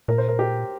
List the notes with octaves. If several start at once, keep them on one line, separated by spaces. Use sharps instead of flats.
A#2 A#4
C5
A#4
G4